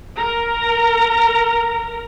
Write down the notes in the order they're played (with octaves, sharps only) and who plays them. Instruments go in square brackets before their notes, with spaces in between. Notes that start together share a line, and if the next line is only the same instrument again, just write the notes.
[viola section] A#4 A#5